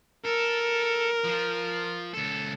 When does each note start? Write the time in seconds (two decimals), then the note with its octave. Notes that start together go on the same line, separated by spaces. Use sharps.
0.25 A4 A#4
1.24 F3 F4
2.14 C#2 A4